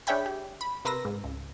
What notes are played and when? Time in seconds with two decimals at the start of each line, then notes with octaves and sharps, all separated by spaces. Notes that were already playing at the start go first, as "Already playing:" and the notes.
0.07 D4 G#4 C#5 E5 G5 B5
0.26 G4
0.61 B5
0.85 C3 A#4 B4 C6 E6 A#6
1.05 G#2
1.24 C#2